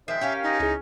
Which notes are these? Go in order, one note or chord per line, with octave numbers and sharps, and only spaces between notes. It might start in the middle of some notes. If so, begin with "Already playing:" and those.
D#3 F3 G#3 E5 G5 C7
C#4 G4 A#4 F5
D#4
C#2 E4 G#4